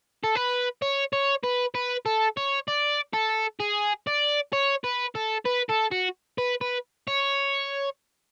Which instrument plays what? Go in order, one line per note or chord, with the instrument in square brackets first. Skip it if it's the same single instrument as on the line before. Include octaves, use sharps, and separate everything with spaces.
[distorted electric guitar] A4
B4
C#5
C#5
B4
B4
A4
C#5
D5
A4
G#4
D5
C#5
B4
A4
B4
A4
F#4
B4
B4
C#5